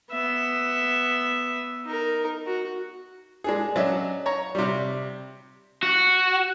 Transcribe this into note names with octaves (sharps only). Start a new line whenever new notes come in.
B3 E5
D#4 A#4
F#4
G#3 D4 G#4
F#3 C#4 D4 D#5 E5
C#5 A#5
C3 G3
F#4